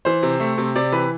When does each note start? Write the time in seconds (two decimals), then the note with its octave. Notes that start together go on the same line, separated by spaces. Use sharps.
0.05 E3 C5
0.23 C3
0.40 A3
0.58 C3
0.75 C3 D5
0.92 E3 B4